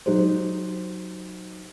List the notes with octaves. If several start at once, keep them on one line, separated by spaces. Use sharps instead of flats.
F#3 D#4 F#4 G4 C5